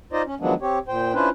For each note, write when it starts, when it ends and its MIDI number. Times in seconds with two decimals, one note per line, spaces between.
0.13 0.22 63
0.13 0.22 65
0.13 0.22 72
0.13 0.22 74
0.13 0.22 75
0.26 0.35 61
0.40 0.54 51
0.40 0.54 53
0.40 0.54 54
0.40 0.54 56
0.40 0.54 59
0.40 0.54 62
0.62 0.79 60
0.62 0.79 67
0.62 0.79 73
0.88 1.14 46
0.88 1.14 72
0.88 1.14 79
1.14 1.29 61
1.14 1.29 62
1.14 1.29 64
1.14 1.29 65
1.14 1.29 71
1.14 1.29 72